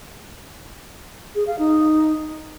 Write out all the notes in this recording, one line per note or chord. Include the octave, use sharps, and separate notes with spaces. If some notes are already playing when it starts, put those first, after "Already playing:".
G#4
F5
D#4